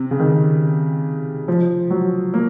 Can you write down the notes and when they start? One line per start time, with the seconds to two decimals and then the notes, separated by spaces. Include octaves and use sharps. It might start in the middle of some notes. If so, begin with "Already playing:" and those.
Already playing: C3
0.11 C#3
0.20 D#3
1.48 F3
1.90 F#3
2.34 A#3